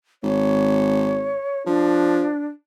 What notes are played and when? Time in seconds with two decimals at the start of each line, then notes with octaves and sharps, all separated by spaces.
0.24 G#1 C#5
1.66 F3 D4